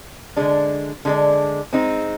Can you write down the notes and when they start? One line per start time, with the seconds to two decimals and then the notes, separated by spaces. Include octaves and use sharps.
0.36 D3 G#3 D4
1.05 D3 G#3 D4
1.73 G#3 C4 D#4